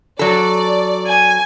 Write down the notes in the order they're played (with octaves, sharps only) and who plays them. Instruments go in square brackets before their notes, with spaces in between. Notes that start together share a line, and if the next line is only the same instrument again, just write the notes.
[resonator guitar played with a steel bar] F#3 A4 [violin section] D5
[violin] G#5